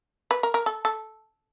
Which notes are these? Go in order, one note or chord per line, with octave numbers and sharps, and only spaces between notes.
B4
A#4
A#4
A4
A4